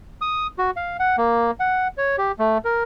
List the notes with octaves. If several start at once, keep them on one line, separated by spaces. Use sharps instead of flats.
D#6
F#4
F5
F#5
A#3
F#5
C#5
G4
A3
A#4